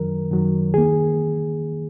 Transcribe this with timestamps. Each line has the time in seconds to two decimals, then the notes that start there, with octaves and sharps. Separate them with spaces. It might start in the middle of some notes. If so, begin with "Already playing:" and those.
Already playing: F#2 D#3 F#3 A#4
0.31 F#2 D#3 F#3
0.73 D#2 D#3 A#3 G#4